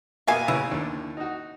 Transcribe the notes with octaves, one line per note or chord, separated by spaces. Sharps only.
B2 A#3 B3 E5 F5 G#5
A1 C#3 E4 B4
D#2 D4
D#4 F#4